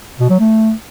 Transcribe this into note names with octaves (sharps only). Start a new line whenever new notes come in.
B2
F#3
A3